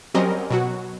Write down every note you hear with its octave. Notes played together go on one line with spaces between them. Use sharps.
F#3 G3 C4 C#4 A#4 D#5
B2 F#3 F#4